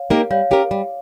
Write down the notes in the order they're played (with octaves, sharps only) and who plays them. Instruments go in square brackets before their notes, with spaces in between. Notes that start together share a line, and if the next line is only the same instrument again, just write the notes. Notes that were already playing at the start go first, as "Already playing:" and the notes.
Already playing: [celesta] C#5 F5
[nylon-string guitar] A#3 D#4 G4 A#4
[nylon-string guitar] G3 [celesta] C#5 F5
[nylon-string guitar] C#4 G4 A#4
G3